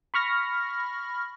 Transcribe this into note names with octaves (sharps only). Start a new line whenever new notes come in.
B5 C#6 F6 A#6